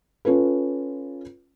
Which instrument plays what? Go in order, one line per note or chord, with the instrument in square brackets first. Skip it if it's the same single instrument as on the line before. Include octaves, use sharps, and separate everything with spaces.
[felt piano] C#4 F4 A4 B4